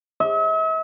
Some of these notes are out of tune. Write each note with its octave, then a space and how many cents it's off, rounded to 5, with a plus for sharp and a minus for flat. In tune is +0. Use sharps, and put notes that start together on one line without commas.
E5 -45